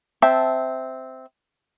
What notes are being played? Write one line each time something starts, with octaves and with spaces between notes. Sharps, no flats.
C4 E5 A5